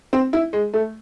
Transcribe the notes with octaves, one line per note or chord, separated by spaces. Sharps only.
C4
E4
G#3
A3